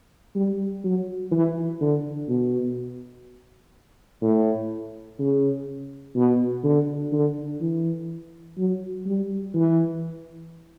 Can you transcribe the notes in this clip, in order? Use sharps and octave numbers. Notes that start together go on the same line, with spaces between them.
G3
F#3
E3
D3
B2
A2
C#3
B2
D3
D3
E3
F#3
G3
E3